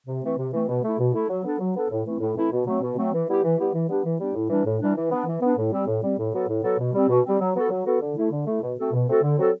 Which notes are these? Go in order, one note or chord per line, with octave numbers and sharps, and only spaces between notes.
C3
E3 A3 C4
C3
E3 A3 C4
B2
A3 E4
B2
A3 E4
F#3
B3 D4 A4
F#3
B3 D4 A4
A2
E3 A3 C4 E4
A2
E3 A3 C4 E4
B2
F#3 A3 C4
B2
F#3 A3 C4
E3
G3 B3 E4 G4
E3
G3 B3 E4 G4
E3
G3 B3 D4 G4
E3
G3 B3 D4 G4
A2
E3 G3 D4
A2
E3 G3 D4
E3
B3 D4
E3
B3 D4
A2
G3 C4
A2
G3 C4
A2
F#3 B3 F#4 A4
A2
F#3 B3 F#4 A4
B2
G3 C4
B2
G3 C4
F#3
B3 F#4 A4
F#3
B3 F#4 A4
D3
A3 E4
D3
A3 E4
B2
A3 C4 F#4 A4
B2
A3 C4 F#4 A4
D3
F#3 C4 F#4 A4